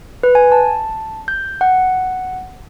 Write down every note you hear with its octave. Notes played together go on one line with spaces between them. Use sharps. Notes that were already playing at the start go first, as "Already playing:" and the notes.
B4
G#5
A5
G6
F#5